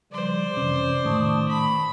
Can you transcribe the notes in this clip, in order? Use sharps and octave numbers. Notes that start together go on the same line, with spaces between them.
C#3 F3 G3 C5 D5
F2 C3 E3 C#4
A2 D#3 A3 A5 C#6 D#6
B5